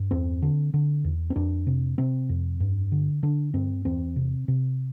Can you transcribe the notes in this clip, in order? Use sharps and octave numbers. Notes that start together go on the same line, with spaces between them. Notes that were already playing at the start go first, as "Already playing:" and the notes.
Already playing: G2
E2 C4
D3
D3
E2
C4
F2 D4
C3
C3 C4
F2
G2
D3
D3 D4
G2 C4
E2 C4
C3
C3